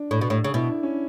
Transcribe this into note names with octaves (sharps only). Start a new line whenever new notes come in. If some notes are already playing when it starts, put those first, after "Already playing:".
Already playing: D4
A2
B2
A2
C#3
B2 E4
D4
C#4